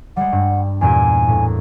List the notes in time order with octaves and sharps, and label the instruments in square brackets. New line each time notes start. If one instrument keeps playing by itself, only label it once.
[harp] G3 G#3 [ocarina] F#5
[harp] G2
[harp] E2 A#2 G4 [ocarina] G#5
[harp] A2